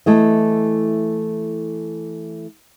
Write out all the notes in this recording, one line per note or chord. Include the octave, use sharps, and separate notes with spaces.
E3 A3 E4 D#5